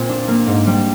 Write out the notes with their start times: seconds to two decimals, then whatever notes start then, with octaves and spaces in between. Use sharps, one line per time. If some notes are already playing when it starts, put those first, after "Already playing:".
Already playing: A#2 C4
0.09 D4
0.28 A#3
0.47 G#2
0.67 G3